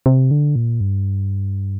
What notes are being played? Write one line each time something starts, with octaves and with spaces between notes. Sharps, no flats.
C3
D3
A#2
G2